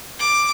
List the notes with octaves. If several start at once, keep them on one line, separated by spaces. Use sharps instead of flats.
D6